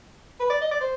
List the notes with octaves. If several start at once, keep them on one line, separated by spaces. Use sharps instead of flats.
B4
D5
D#5
D5
C5